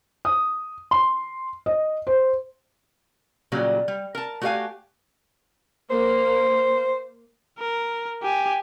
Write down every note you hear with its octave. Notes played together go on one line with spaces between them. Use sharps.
D#6
C6
D#5
C5
A#2 C#3 F#3 G3
G3
A#4 A5
A3 F#4 G4 D5 F5 G#5
A#3 C5
A#4
G4 G#5